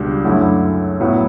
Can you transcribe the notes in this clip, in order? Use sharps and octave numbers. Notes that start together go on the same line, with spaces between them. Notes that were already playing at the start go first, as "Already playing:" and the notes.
Already playing: C#2 B2 G3 D4
F#2 D3 A3 E4
A2 F#3 B3 E4